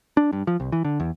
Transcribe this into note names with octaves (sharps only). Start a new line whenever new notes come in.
D4
G2
F3
C2
E3
D3
E2